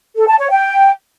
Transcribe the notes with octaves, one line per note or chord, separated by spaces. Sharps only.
A4
A5
C#5
G5